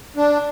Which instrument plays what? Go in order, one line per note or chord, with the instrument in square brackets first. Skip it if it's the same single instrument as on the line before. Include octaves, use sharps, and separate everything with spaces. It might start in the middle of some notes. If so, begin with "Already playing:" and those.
[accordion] D4